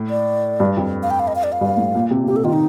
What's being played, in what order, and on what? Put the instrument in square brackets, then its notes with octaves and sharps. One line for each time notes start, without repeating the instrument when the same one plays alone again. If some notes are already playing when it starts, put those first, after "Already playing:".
Already playing: [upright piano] A2
[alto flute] D5
[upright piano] G2
F2
[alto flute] F5
G5
F5
D#5
F5
D5
F5
[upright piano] G2
A2
A#2
C3
A#2
[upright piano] C3 [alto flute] G4
[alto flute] A4
[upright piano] D#3 [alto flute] F4
[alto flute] D#4